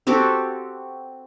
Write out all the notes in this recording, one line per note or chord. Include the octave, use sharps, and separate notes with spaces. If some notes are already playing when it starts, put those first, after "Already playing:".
C4 F#4 G4 A4